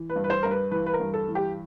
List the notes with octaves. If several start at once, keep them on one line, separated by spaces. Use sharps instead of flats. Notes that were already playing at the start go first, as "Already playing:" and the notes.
Already playing: E3
B4
G2
B4
C5
G2 A#4
B4
E3 B4
B4
A#4
G2
A4
E3
G4